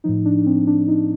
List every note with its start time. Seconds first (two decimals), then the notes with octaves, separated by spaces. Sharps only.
0.04 A2 F3 D#4
0.25 D4
0.46 C4
0.67 D4
0.88 D#4